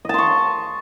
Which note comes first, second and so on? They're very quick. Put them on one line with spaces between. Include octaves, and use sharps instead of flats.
D#5 A5 C6 C#6